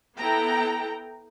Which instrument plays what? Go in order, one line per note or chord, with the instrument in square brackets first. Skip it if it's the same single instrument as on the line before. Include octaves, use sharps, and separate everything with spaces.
[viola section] B3 E4 A4 G5 A#5